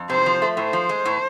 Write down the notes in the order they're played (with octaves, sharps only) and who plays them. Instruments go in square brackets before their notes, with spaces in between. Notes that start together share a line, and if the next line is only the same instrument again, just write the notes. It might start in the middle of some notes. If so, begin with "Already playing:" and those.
Already playing: [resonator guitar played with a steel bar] F2
[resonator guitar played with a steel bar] C3 [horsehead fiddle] C5
[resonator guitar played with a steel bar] F3
A3
[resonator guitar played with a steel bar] A2 [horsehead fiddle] C5
[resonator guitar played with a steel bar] F3
G#3
A2